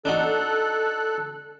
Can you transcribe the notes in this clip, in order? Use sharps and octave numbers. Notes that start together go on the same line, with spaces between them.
D4 D#4 F#4 A4 F#6